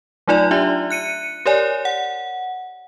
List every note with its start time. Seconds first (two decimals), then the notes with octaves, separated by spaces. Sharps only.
0.28 F#3 A3 D#4 F4 D5
0.51 D4 F4 G4 E5
0.90 F#6 C#7 D#7
1.46 G4 A#4 C#5 D5 G#5
1.85 F#5